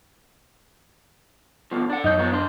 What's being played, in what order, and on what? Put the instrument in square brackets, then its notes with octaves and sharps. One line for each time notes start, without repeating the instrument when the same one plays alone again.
[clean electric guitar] D2 B2 F3
D4 F#5
[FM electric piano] F#2 D#5 G6 [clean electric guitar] D#4 C#5
[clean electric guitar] F3 B3 C#5
C2 D4 C6